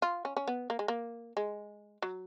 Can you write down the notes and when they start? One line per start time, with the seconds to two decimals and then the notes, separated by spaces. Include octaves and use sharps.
0.02 F4
0.25 C#4
0.37 C#4
0.47 B3
0.70 A#3
0.79 G#3
0.88 A#3
1.37 G#3
2.02 F#3